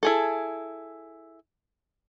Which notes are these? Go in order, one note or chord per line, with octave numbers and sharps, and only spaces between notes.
E4 G#4 A4